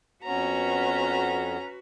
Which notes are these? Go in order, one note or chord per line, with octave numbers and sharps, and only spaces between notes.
F2 B3 C#4 F#4 B4 A#5